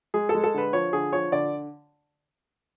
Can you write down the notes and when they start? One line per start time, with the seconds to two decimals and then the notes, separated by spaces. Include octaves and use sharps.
0.14 G#3 G#4
0.29 A4
0.35 G#3
0.44 A4
0.54 D3 B4
0.73 F3 C#5
0.93 D3 G#4
1.13 F3 C#5
1.32 D3 D5